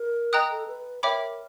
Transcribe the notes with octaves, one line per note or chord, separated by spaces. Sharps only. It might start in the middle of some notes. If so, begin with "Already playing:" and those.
Already playing: A#4
D#5 G5 A#5 D#6 F#6
A4
B4
A#4 C#5 E5 G5 B5 D6